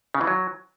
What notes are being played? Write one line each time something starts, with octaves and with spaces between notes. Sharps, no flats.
C#3
E3
F#3